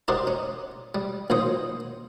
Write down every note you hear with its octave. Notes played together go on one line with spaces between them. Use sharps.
D#4 F#4 G4 A#4 C5 D5
C#4
G3
A#1 D#3 F#3 C5 D#6